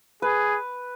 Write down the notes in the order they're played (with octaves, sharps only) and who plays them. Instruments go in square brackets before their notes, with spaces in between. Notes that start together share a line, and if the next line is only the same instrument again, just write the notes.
[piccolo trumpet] G#4 [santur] B4